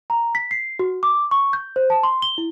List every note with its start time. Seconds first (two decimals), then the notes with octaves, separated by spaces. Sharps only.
0.10 A#5
0.35 B6
0.51 C7
0.79 F#4
1.03 D6
1.31 C#6
1.53 G6
1.76 C5
1.90 A5
2.03 C6
2.22 G7
2.38 E4